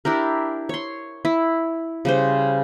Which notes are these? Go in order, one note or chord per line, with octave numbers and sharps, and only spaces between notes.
D4 E4 G4 A#4
C#5 C6
E4
C#3 G3 C5